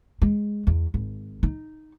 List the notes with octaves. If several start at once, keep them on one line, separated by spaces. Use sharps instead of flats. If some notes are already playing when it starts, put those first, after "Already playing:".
G#3
E2
G#1
D#4